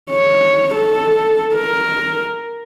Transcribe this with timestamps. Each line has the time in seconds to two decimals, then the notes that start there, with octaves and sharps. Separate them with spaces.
0.10 C#5
0.75 A4
1.53 A#4